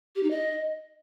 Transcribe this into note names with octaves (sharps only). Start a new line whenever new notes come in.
G4
D#4
D#5